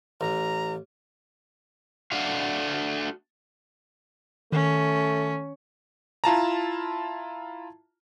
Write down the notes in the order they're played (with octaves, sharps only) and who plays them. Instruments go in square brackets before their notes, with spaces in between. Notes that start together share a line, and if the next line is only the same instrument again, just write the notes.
[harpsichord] A1 [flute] A#5
[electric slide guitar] A3 D4 F#4 F5
[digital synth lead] D#3 [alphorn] A3 [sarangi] C#4
[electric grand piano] E4 F4 A5 A#5